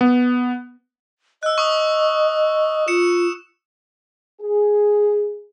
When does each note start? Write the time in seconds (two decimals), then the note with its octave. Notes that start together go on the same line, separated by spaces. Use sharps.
0.01 B3
1.43 D#5 E6 F#6
1.58 C#6 D#6
2.88 F4 C#7 E7
4.41 G#4